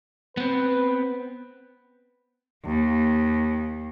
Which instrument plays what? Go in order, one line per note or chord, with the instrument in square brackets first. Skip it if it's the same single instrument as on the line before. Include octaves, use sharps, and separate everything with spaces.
[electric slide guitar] B3 C4 [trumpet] B4
[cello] D#2